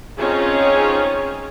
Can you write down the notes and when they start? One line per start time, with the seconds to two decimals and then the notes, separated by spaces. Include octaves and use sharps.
0.18 C4 C#4 D#4 F4 G#4 C#5